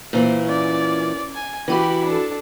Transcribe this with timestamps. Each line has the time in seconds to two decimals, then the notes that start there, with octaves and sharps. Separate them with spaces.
0.13 A#2 E3 C5
0.47 C#4 D5
1.35 G#5
1.68 E3 E4 F#4 G4 B5
2.05 D4 A4